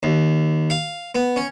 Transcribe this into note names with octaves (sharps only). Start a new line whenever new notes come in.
D#2
F5
B3
C#4